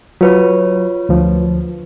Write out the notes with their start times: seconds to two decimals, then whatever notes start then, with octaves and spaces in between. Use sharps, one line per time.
0.21 F#3 F4 B4 C#5
1.09 D2 F3